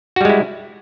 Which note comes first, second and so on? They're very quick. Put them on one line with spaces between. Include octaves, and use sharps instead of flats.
F#4 G3 G#3 E4